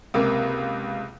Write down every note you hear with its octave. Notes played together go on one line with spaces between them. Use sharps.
C#2 C3 A#3